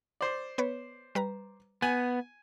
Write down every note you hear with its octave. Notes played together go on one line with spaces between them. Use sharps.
C5 D5
B3 B4 C#5
G3 B4 A#5
B3 G#5